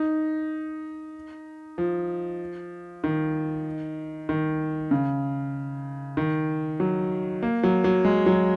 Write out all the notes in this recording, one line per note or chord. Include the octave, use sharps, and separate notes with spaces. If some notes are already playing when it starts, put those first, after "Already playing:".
Already playing: D#4
F3
D#3
D#3
C#3
D#3
F#3
A#3
F#3
F#3
G#3
F#3